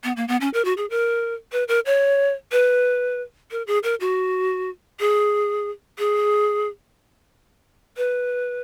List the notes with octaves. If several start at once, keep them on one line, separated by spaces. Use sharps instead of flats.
B3
A#3
B3
C#4
A#4
F#4
G#4
A#4
B4
A#4
C#5
B4
A#4
G#4
A#4
F#4
G#4
G#4
B4